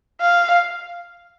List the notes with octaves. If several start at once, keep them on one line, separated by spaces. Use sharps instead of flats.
F5